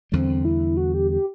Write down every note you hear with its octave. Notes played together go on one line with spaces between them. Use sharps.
E2 D3 G3 C4
E4
F#4
G4
G4